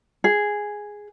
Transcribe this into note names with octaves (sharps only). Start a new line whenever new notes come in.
G#4